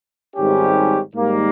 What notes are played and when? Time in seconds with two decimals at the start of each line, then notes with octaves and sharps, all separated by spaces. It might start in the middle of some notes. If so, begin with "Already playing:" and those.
0.36 G#1 G#2 G3 C#4 G4
1.15 G#2 D#3 G3 A#3